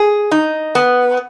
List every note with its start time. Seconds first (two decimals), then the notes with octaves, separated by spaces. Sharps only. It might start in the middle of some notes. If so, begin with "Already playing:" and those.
Already playing: G#4
0.31 D#4
0.75 B3